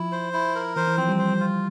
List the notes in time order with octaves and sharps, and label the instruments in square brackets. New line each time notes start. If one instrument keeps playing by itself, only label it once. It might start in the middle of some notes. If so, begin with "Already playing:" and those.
Already playing: [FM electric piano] F3 [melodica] E4
[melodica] C5
E4
A#4
[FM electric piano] E3 [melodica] C5
[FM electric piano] E3
[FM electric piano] F3 [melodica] C4
[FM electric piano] G3
[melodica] C5
F4